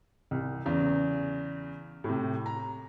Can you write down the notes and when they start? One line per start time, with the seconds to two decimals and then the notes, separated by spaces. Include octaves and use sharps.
0.31 C2
0.66 E2 C#3
2.04 A2 C3
2.46 A#5